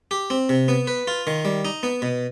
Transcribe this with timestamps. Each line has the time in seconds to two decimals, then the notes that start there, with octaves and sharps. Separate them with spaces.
0.11 G4
0.30 C4
0.49 C3
0.68 B3
0.87 B4
1.08 F4
1.27 D#3
1.45 G3
1.65 D#4
1.83 B3
2.02 B2